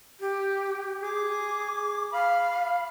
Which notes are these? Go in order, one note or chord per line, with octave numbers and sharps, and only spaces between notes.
G4
G#4 D6
F5 B5